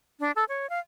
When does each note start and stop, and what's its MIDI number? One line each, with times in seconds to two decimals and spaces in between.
0.20 0.31 62
0.36 0.44 69
0.49 0.69 73
0.70 0.79 77